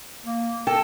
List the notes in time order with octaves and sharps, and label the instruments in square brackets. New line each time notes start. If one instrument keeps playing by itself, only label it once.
[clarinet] A#3
[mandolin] A4 [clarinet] A#4 [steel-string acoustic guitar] G5